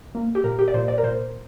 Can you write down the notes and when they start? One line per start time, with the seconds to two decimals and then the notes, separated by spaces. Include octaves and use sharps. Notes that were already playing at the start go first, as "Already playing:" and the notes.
0.15 A#3
0.35 G4
0.44 A#2 A#4
0.59 G4
0.68 D5
0.74 A#2 C5
0.88 D5
0.98 A#4
1.03 A#2 C5